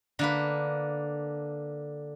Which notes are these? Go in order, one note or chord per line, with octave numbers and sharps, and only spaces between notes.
D3 A#3 B4